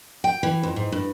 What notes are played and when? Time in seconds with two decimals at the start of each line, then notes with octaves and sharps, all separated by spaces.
0.24 G5
0.43 E3
0.63 F2
0.76 G#2
0.92 G2